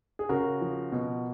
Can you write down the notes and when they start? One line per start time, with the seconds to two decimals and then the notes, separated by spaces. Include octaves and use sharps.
0.19 G#4
0.29 C#3 F#4 A#4
0.61 F3
0.92 B2